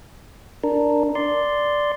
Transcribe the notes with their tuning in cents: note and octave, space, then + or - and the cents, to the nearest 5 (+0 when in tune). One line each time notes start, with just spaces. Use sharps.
D4 +0 A#4 +0
D5 +0 C6 -5